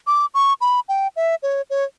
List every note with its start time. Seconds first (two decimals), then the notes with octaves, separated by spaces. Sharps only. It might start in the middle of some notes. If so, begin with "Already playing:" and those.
0.07 D6
0.34 C#6
0.61 B5
0.89 G5
1.16 E5
1.43 C#5
1.70 C#5